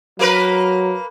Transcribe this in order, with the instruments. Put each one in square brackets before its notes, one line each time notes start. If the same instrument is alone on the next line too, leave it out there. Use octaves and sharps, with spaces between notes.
[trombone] F#3 [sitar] A#3 A#4 B4